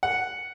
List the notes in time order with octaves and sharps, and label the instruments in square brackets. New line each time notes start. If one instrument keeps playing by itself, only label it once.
[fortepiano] F#5